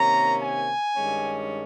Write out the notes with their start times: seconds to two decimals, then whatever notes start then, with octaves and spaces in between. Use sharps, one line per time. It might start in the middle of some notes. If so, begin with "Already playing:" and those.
Already playing: C3 D#3 A#3 C#4 A#5
0.41 G#5
0.96 G2 D#3 G#3 C#4